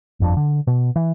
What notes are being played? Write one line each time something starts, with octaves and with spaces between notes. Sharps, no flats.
G1 F2 D4
D3
B2
E3